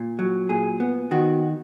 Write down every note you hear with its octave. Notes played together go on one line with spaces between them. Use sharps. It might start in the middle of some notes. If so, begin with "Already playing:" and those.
Already playing: A#2
F#3
A#2 G#4
B3
D#3 F#4